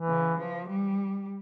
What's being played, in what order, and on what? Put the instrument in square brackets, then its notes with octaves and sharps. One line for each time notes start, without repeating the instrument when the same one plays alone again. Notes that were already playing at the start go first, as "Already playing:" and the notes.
Already playing: [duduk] E3
[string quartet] C#3
F3
G3